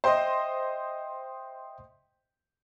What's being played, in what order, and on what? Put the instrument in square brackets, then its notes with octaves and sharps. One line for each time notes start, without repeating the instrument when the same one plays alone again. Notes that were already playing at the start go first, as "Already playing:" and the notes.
[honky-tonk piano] C5 D#5 [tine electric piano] E5 G5 C6